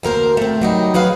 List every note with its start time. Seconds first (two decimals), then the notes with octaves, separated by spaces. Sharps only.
0.03 D2 A#3 A#4 C5
0.37 A3 C4
0.61 F#3 G3 D#4
0.94 F#2 F#3 G#4 B4 F5